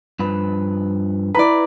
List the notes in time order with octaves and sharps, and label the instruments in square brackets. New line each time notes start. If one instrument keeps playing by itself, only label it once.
[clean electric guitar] G2 F3 B4
[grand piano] E4 A#5 B5 [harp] B4 D5